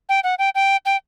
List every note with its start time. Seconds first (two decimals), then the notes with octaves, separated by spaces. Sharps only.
0.09 G5
0.24 F#5
0.39 G5
0.55 G5
0.86 G5